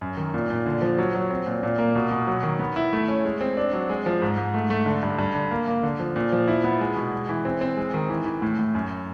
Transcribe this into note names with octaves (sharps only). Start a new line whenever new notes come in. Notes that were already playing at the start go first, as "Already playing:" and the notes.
F#2
D#3
A#2
A#2
D3
F3
F#3
F#3
C4
A#2
A#2
A#3
B2
B2
F#3
D#3
B3
E4
A3
C#4
G#3
C4
D4
F#3
G#3
F3
G#2
G#2
A3
A3
D3
G2
G2
D3
A#3
A#3
D3
F3
A#2
F3
E4
B3
G#3
B2
G#3
E3
C4
C4
G#3
D#3
E3
E3
A2
A2
F#2